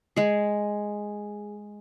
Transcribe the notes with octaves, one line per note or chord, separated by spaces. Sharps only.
G#3 G#4